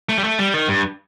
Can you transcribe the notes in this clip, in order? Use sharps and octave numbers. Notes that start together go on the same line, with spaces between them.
A3
G3
A3
G3
D#3
G2